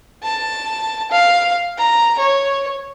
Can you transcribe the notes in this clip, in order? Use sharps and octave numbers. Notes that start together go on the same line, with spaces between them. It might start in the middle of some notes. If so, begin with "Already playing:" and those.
A5
F5
A#5
C#5